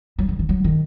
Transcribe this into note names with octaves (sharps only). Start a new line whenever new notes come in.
F#3
D#3
D#3
F#3
D#3